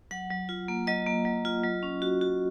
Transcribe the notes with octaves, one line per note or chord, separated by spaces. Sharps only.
F#3 F#5
F#3
F4
A#3
F#3 D#5
A#3
F#3
F4
F#3
C#4
F#4
F#4